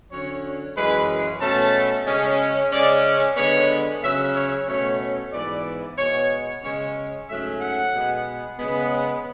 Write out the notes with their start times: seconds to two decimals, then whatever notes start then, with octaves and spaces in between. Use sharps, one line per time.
0.11 D3 F#3 C#4 C#5
0.75 F#2 E3 G#3 C#4 B4
1.41 B2 A3 C#4 A5
2.07 C#3 G#3 C#4
2.72 C#3 G#3 C#4 D5
3.37 D3 G#3 B3 C#5
4.02 C#3 F#3 C#4 E5
4.34 C#5
4.67 B2 A3 C#4 C#5
5.32 G#2 E3 B3 D5
5.98 B2 G#3 B3 C#5
6.63 C#3 G#3 C#4 C#5
7.28 G#2 F#3 A3 C#4 E5
7.61 F#5
7.93 B2 G#3 B3
8.59 C#3 G#3 B3